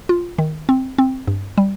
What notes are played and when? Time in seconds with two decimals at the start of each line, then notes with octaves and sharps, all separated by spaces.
0.09 F4
0.38 D#3
0.69 C4
0.98 C4
1.27 G2
1.58 G3